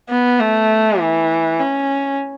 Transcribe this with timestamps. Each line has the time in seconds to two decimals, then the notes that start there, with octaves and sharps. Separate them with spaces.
0.10 B3
0.40 A3
1.00 E3
1.60 C#4